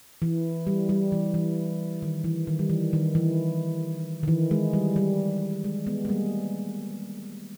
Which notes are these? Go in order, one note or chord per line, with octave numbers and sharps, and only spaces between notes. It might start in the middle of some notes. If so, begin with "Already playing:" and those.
E3
G3
G3
E3
E3
D#3
E3
D#3
G3
E3
D#3
E3
D#3
E3
G#3
G3
G3
G#3
G#3 B3
G#3
G3 A#3